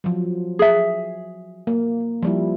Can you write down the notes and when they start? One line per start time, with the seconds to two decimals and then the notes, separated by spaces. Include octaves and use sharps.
0.04 F3 F#3
0.59 G#4 E5
1.67 A#3
2.23 F3 G3 E4